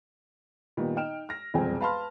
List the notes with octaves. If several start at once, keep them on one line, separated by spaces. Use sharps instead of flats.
A#2 D#3 G3 B3
D#4 G5 F6 D7 E7
F6 A#6
E1 C2 F2 C4 G5 G#5
B4 F5 A5 B5 C6 F6